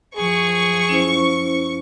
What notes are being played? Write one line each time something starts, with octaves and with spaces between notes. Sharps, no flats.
F#2 F3 G#4 C#6
C#4 E4 C5